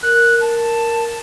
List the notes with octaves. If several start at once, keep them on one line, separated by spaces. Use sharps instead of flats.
A#4 F#6
A5